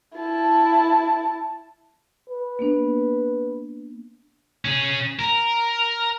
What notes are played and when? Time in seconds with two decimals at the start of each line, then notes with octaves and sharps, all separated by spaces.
0.17 E4 A5
2.30 B4
2.59 A#3 B3 D4
4.65 C#4 G#4
5.19 A#4